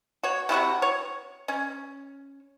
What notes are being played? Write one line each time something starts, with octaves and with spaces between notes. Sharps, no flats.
F#4 C#5
C3 E4 F#4 F#5
C#5
C#4